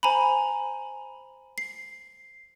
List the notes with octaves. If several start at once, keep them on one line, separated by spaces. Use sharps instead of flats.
C5 G#5 A#5 B5
C7